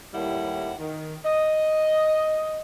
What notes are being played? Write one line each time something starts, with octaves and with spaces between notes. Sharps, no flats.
D#2 A2 D#3 G3 E4 F#5
D#3
D#5